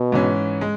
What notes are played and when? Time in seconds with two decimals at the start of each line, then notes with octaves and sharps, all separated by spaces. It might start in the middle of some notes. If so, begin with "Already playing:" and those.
Already playing: B2
0.12 G#2 E3 C#4
0.61 G#3